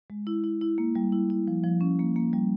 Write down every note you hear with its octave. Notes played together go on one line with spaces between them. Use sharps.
G#3
E4
E4
E4
A#3
G3
E4
E4
F3
F3
C#4
A#3
A#3
G3